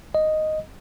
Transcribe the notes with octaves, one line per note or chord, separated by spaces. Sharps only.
D#5